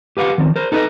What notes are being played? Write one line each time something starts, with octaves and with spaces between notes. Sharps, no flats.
G4 B4 F5 F#5
D#3 F3 C4
A#4 C5
D#4 A4 B4 D5 D#5